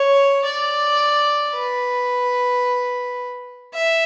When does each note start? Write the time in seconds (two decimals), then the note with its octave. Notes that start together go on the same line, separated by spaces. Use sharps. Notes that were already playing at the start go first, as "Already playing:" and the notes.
Already playing: C#5
0.45 D5
1.55 B4
3.74 E5